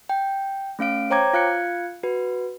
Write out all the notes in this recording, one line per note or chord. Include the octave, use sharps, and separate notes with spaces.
G5
A3 C#4 F5 D7
C5 C#5 G5 A#5 D6 G#6
F4 F5 F#6 G#6 C#7
F#4 B4